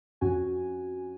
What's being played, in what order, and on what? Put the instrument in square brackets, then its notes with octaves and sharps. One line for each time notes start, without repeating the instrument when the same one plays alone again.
[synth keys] F2 C#4 F#4 G#5